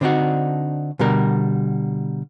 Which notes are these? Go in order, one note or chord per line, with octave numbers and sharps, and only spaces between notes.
D3 C4 D4 D#4 F#4
B2 D3 G3 A#4